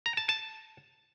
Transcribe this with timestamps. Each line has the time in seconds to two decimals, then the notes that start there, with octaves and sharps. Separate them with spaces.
0.06 A#5
0.17 A5
0.29 A5